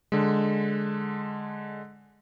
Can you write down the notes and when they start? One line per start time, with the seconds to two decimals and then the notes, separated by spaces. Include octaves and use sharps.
0.12 D3 G#3